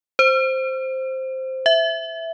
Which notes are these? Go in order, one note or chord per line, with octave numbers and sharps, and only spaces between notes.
C5
E5